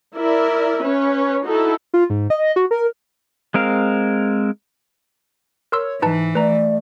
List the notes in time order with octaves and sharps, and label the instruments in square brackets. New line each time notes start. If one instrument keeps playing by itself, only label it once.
[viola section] E4 A#4 D5 E5
C#4 B4 C#5
D#4 E4 F#4 A4
[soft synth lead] F4
G#2
D#5
F#4
A#4
[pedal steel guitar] G#3 C4 A#4 F5
[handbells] A#4 C6 E6 [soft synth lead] C#5
[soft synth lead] G#2 [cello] E3 [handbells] D#4 B4 A5
[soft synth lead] A3 [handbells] B4 A#5 [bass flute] D5